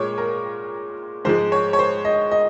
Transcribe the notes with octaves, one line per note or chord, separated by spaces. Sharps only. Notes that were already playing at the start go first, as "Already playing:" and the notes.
Already playing: A#2 G#3 C#5
A#4
G#2 F3 G#3 C5
C#5
C#5
C5
D#5
D#5